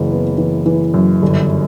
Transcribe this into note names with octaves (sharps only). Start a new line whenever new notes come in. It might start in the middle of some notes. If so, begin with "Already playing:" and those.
Already playing: F#1 E3
B3
E3
E3
F#2
G1